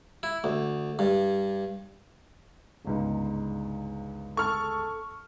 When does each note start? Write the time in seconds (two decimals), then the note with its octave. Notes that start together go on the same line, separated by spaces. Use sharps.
0.23 E4
0.44 D2
0.99 G2
2.85 G1 C#2 G#2
4.37 A4 C#6 F6